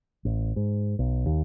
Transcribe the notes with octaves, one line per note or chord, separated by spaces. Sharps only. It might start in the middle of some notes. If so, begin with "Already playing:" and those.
A1
G#2
B1
D#2